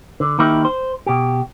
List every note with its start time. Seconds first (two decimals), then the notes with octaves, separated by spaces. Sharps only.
0.20 D3
0.39 D#3 A#3 D#4 E4 G4
0.65 C5
1.07 B2 G4